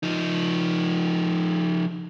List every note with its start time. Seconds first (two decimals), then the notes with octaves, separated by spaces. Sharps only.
0.03 F3 D#4